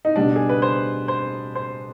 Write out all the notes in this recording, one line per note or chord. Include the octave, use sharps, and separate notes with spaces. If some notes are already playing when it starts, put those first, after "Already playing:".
D#4
B2 G3 D4
G#4
B4
C5
C5
C5